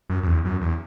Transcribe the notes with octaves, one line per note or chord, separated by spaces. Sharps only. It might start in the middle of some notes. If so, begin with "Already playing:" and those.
F#2
F#2
E2
F#2
E2